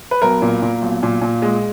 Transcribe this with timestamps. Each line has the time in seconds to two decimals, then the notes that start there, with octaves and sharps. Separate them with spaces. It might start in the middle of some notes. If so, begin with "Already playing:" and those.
0.11 B4
0.22 B1 A#4
0.42 A#2
0.62 A#2
0.82 B1
1.03 A#2
1.22 A#2
1.42 G#3